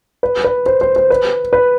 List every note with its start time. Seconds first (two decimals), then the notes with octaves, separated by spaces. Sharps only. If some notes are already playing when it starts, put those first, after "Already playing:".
0.23 B4
0.44 B4
0.66 C5
0.81 C5
0.96 C5
1.10 B4
1.53 B4